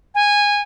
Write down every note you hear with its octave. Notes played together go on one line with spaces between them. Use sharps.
G#5